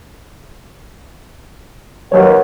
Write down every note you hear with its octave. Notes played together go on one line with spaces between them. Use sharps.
D#2 F#3 B4 C#5 F#5